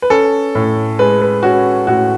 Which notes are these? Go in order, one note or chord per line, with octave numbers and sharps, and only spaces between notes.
B4
C#4 A4
A2
G#3 B4
B4
C#4 F#4
A2 F#4